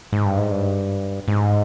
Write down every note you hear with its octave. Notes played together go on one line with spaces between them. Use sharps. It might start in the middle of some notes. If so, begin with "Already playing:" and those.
G#2
G2
G#2
G2
G#2